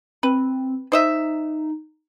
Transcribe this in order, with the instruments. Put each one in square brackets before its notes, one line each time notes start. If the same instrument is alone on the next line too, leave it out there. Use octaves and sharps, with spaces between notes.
[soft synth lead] C4 [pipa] B4
[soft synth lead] D#4 [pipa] C5 D#5 E5